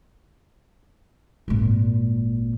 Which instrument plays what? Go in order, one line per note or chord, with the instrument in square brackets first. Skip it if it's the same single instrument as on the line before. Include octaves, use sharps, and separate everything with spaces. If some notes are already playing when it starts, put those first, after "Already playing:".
[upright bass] G#1 A#2